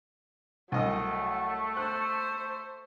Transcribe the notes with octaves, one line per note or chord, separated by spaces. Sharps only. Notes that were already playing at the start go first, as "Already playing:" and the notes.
C2 F#3 A3 D#5 D#6
C5 F#6